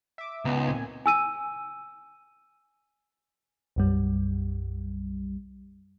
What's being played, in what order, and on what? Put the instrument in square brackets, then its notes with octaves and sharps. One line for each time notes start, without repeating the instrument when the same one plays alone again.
[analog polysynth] E5 D6
[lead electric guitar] C#2 [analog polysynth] B3 D#4
[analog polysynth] A#2 C4 G#5
[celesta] G#5 E6 D#7
[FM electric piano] B1 F#2 G3